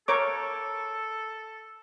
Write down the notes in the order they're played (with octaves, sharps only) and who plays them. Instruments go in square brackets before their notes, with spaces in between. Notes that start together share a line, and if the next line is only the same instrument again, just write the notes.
[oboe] A4 [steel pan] A#4 C#5 D6